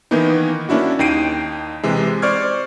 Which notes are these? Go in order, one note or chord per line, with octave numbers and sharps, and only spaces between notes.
D#3 E3 A#3 B3 D#4
A#3 C#4 D4 E4 F#4
D#2 D#4 G5 C7 D7 D#7
C3 E3 G#3
C5 D5 C#6 F6 G#6